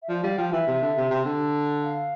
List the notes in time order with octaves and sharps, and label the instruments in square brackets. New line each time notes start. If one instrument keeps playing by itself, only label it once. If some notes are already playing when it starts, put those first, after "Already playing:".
[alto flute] E5
[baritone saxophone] F3 [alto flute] D5
[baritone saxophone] G3 [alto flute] F5
[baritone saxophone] F3 [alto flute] G5
[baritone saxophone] E3 [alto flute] E5
[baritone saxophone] C3
D3
C3
C3
D3
[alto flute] F5